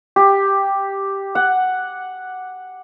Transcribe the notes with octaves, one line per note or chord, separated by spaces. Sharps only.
G4
F#5